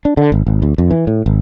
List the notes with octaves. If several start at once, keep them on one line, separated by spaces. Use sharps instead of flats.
D4
D3
G#1
G#1
D2
F2
E3
A2
G#1